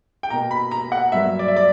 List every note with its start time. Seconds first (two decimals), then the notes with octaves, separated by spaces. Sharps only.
0.23 G5
0.30 B2 A#3 A#5
0.51 B5
0.71 A#5
0.92 F#5
1.12 G2 F#3 A#3 E5
1.39 D5
1.48 E5
1.56 D5